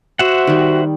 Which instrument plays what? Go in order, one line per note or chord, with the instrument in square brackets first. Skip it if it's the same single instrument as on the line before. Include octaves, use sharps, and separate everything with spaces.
[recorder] F#4 [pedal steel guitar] C5 E5 F#5
[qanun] D#3 G3